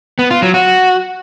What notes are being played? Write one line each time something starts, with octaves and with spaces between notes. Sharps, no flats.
B3
F4
F#3
F#4